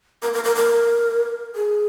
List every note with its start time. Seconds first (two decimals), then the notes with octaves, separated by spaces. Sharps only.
0.22 A#4
0.33 A#4
0.44 A#4
0.56 A#4
1.55 G#4